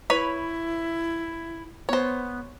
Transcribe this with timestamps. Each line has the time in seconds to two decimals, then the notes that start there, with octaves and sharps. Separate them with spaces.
0.10 E4 B4 C#5 B5
1.89 B3 C5 C#5